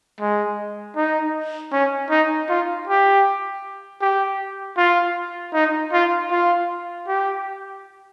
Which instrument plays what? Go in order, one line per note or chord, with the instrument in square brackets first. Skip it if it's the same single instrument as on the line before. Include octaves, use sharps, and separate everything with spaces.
[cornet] G#3
D#4
C#4
D#4
F4
G4
G4
F4
D#4
F4
F4
G4